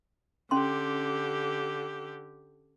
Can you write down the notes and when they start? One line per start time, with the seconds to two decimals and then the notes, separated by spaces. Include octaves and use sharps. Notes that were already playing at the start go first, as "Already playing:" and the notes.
0.51 D3 C#4 G4 C6